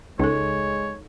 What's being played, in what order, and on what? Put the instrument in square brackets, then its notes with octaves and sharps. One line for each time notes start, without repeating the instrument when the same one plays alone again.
[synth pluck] C#2 [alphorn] G#3 [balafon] D#4 A4 [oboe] C#5